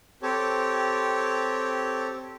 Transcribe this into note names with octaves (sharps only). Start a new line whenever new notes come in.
C4 G4 A4 C#5